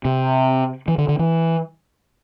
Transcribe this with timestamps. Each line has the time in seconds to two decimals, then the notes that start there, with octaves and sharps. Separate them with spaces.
0.05 C3
0.88 E3
0.98 D3
1.08 D3
1.19 E3